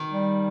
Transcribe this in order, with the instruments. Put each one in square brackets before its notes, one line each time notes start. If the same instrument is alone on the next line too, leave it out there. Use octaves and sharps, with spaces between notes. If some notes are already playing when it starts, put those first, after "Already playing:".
Already playing: [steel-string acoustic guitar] D#3
[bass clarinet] G3